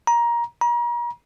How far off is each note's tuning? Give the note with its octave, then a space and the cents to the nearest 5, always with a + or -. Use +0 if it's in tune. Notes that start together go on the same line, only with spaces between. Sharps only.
A#5 +20
A#5 +40